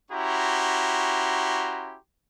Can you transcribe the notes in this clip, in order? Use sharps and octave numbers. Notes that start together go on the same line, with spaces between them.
C#4 E4 F#4 G4 A#5 C6